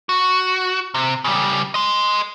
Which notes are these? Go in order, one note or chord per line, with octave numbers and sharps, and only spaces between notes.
F#4
C3
C#3 G3
D#5 C6